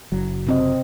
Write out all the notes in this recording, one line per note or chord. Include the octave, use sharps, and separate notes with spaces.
F#1 F#3
C3 C4 D#5